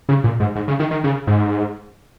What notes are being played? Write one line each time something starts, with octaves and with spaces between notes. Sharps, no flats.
C#3
A#2
G#2
G#2
C#3
D#3
D#3
C#3
G#2